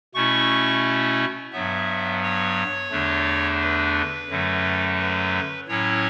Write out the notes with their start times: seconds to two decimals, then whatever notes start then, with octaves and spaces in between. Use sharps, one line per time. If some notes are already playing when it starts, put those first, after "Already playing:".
0.14 B2 A3 C#4 E4 C#6
1.53 G2 F#3 B3 E5
2.22 C#5
2.91 E2 D3 A3 D4
3.60 B4
4.29 F#2 D3 F#3 A3
4.98 B4
5.68 A2 F#3 C#4 E4 C#5